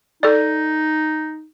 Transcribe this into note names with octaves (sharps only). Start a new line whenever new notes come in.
D#4 A4 D5